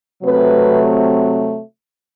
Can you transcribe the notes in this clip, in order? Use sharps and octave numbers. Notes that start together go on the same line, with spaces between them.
C3 F#3 A3 C4 B4